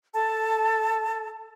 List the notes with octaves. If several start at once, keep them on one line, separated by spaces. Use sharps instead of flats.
A4 A5